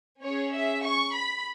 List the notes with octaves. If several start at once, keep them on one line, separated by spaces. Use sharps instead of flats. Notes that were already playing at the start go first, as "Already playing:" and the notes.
C#4 G#4 C#5
E5
C#6
B5